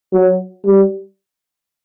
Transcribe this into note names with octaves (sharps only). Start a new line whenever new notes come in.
F#3
G3